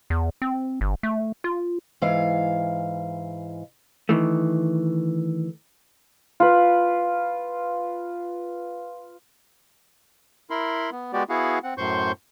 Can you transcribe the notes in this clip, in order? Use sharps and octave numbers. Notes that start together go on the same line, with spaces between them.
E2
C4
G1
A3
F4
G#2 E3 F5
D#3 E3 A3
F4 B4
E4 A#4 B5 C6
B3
G#3 B3 F#4 G4 D5
B3 E4 F#4 G#4 F5 F#5
C4 F#5
F#2 A2 C5 C6 C#6 G6